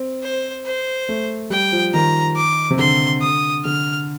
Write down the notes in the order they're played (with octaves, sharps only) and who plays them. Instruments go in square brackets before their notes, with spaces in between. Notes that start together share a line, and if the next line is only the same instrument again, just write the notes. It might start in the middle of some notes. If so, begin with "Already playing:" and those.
Already playing: [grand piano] C4
[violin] C5
C5
[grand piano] A3
[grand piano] G3 [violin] G5
[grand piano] F3
[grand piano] D#3 [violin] A#5
[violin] D6
[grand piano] C3
[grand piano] D3 [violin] C6
[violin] D#6
[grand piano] D3 [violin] F6